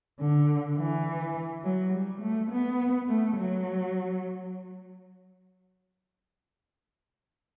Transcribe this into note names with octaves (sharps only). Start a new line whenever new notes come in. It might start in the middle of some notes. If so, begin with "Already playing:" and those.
D3
E3
F#3
G3
A3
B3
A3
F#3